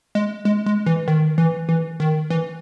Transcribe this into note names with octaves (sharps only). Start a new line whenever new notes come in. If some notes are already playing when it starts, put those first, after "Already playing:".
G#3
G#3
G#3
E3
D#3
E3
E3
D#3
E3